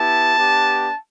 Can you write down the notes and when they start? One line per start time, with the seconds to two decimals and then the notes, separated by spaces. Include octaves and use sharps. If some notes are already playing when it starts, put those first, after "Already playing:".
Already playing: B3 E4 G4 A5
0.35 B3 D4 G4